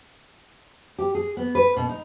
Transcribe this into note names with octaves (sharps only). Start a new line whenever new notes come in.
G4
G#4
B3
B4
B2
D#4